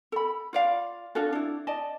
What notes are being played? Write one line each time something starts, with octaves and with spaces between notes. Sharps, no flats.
A4 B5
F4 D5 F5
D4 F4 F#4 A4
D4 E4
D5 D#5 A5